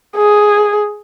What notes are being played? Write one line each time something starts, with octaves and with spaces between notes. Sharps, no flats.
G#4